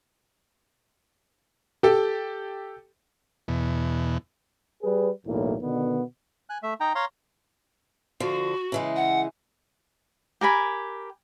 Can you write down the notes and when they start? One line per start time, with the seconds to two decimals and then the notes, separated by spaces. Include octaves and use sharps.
1.83 G4 A4
3.48 E2 B2
4.82 G3 G#4 B4
5.26 B1 E2 A2 A#3
5.62 B2 D3 D#3 B3
6.50 G#5 F#6
6.63 A3 E5
6.80 D#4 G5 A#5
6.95 C#5 F5 A#5 C6
8.20 D3 F3 F#4
8.72 C#3 E3 G#3
8.96 F#5
10.41 G4 A#4 G#5 B5